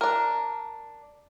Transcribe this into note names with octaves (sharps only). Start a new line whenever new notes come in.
D4 A#4